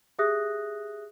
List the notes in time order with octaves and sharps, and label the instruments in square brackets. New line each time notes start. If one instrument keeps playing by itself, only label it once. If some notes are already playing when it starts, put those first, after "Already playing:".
[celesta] G4 G#4 E5 D#6 F#6 A#6